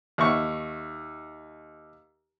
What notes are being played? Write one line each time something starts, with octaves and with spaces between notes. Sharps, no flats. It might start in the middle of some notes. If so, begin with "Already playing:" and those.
D#2 E5 C#6